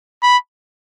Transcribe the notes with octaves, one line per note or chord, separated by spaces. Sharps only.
B5